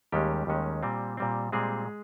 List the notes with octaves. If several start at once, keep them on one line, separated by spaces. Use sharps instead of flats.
D#2 D#3 G3 G#3 C#4 G4
D#2 D#3 G#3 C#4
A#2 G3 C4
A#2 G3 C4
A#2 G3 G#3 C4 G#4